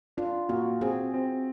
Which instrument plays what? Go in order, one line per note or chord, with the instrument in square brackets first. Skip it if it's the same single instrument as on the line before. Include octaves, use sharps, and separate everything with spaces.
[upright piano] D4 [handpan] F4
[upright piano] A#2 [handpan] F#4
[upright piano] C4 [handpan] G#4
[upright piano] C4